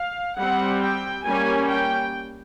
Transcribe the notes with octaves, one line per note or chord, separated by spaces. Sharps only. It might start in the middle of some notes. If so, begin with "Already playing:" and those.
Already playing: F5
G3 C4 F#5
G5
G3 A#3 C#4 G#5
G5